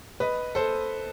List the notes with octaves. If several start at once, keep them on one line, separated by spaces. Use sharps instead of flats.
B4 D#5
A4 C5